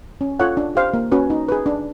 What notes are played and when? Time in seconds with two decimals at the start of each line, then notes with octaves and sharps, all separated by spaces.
0.21 C#4
0.39 F4 A4 C#5 F#5
0.57 D4
0.75 G4 C5 F5
0.94 A#3
1.12 C#4 F#4 B4
1.30 D#4
1.49 G#4 B4
1.66 D4